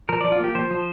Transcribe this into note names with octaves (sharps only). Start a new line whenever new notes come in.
F3 A#4
F3 D5
F4
A#3 G4
F3 C5
F3